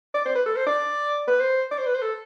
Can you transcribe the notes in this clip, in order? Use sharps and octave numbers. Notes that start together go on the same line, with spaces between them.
D5
C5
B4
A4
C5
D5
B4
C5
D5
C5
B4
C5
A4